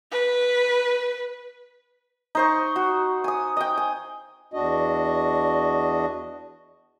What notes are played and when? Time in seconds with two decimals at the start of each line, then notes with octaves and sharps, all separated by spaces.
0.11 B4
2.35 D#4 C5 C#6
2.76 F#4
3.24 G#5 D#6
3.57 D#5 G5
3.77 G#5
4.54 E2 D4 F#4 D#5